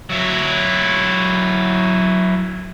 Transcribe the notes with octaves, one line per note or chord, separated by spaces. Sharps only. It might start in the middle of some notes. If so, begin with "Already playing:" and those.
F#3 E4